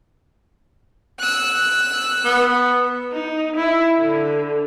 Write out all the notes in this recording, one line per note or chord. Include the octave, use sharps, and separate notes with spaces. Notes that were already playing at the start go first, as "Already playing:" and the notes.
E6 F#6
B3
D#4
E4
D3